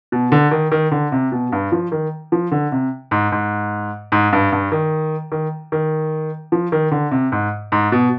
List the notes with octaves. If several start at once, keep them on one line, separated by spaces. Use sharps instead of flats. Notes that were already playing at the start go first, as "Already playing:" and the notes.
B2
D3
D#3
D#3
D3
C3
B2
G2
F3
D#3
F3
D3
C3
G#2
G#2
G#2
G2
G2
D#3
D#3
D#3
F3
D#3
D3
C3
G#2
G#2
B2